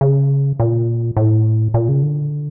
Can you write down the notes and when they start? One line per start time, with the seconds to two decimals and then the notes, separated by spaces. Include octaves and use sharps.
0.01 C#3
0.60 A#2
1.17 A2
1.74 A#2
1.89 C#3
2.03 D3